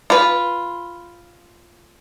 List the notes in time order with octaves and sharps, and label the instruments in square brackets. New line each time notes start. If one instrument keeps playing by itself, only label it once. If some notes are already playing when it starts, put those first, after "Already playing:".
[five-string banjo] F4 B4